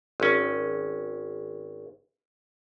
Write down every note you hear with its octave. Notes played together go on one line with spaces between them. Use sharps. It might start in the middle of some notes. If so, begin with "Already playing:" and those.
G#1 C#4